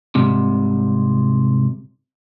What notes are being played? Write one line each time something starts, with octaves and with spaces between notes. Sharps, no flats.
C2 G#2 C3